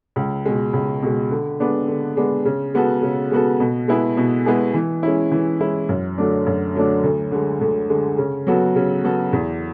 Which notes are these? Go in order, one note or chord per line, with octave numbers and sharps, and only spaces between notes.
C#2
B2 G#3
C#2
B2 G#3
D3
G#3 B3 D4
D3
G#3 B3 D4
C#3
G#3 B3 F#4 A4
C#3
G#3 B3 F#4 A4
B2
G#3 B3 E4 G#4
B2
G#3 B3 E4 G#4
E3
G#3 C#4 E4
E3
G#3 C#4 E4
F#2
D3 F#3 A3 D4
F#2
D3 F#3 A3 D4
D2
D3 G#3
D2
D3 G#3
C#3
F#3 B3 F#4 A4
C#3
F#3 B3 F#4 A4
E2